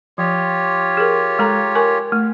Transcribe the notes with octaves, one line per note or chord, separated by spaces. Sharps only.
F3 F4 G4 C#5
G#4 A#4
G#3 A4 A#5
A#4 G#5 C#6
A3